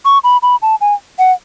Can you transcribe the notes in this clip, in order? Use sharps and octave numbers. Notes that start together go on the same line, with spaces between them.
C#6
B5
B5
A5
G#5
F#5